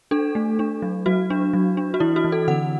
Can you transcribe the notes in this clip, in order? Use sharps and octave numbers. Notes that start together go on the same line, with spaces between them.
D4 A4
A3
D4
F#3
F#3 F#4
D4
F#3
D4
F#4
E3 E4
F#4
E3
A4
D3 F#5